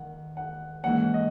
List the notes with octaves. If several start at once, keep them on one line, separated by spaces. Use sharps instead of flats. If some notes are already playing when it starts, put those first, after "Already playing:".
Already playing: D#3 F#5
F#5
G#2 E3 A#3 C#4 F#5
D#5